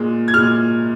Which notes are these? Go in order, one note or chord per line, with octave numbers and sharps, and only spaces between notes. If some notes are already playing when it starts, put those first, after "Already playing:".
Already playing: A#2 G#3
G#6
A#2 G#3 F6